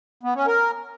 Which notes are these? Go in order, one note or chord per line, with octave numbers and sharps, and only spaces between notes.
B3
C#4
A#4